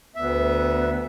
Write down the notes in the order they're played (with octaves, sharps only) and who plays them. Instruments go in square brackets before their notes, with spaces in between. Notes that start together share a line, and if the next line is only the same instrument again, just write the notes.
[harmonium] D2 E5 [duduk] B3